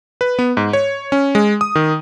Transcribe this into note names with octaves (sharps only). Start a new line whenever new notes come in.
B4
B3
G#2
C#5
C#4
G#3
D#6
D#3